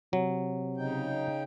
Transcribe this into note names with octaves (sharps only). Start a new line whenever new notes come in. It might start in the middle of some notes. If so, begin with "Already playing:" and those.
C3 F#3
C#3 D#4 G5